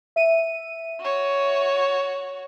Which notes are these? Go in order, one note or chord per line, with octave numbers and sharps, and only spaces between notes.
E5 D#7
F#4 C#5